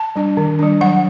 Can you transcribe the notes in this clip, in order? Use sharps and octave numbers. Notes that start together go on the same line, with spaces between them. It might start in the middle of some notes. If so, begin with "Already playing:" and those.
Already playing: A5
G3 D4
D#3
G3 D4
F#3 F#5